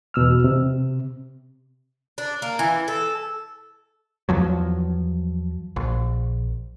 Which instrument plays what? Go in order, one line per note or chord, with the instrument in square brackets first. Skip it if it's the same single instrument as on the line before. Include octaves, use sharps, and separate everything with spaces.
[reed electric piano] E2 B2 E6 F6
C3
[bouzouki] D4
A#3
E3
A4
[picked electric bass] E2 F3 F#3
A#1